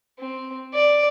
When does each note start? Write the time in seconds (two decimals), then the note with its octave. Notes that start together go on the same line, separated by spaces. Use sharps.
0.19 C4
0.74 D5